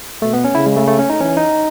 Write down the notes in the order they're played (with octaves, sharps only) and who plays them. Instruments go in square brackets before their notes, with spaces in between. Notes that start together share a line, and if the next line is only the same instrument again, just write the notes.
[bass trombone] B2 [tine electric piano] A3
[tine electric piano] B3
C#4
[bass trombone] C#3 [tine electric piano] E4
[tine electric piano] G#3
A3
A3
C#4
D#4
[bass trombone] E3 [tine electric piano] C#4
[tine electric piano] D#4